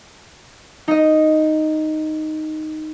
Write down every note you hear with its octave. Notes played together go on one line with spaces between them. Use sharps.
D#4 D#5